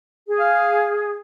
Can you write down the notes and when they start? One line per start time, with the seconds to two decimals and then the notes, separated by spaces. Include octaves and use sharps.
0.28 G#4
0.40 F5